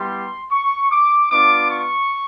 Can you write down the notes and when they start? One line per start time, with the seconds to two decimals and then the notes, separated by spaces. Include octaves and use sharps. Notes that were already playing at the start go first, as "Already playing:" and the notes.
Already playing: G3 B3 E4 G4 C6
0.51 C#6
0.90 D6
1.31 B3 D4 F4 D6
1.70 C#6